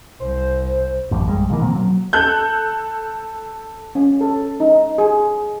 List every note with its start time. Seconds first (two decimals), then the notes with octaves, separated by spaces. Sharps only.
0.20 C2 C5
1.11 A1 F#2
1.28 A#1 G2 G3 G#3
1.50 A#2 D#3 E3 A#3
1.61 B2 F3 A#3 C4
1.75 F#3
2.13 A4 F#6 G6
3.95 C#4
4.21 A4
4.60 D#4
4.98 G#4